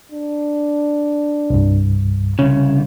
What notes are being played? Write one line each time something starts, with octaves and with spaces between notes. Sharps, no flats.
D4
C2 G2
C2 C#3 C#4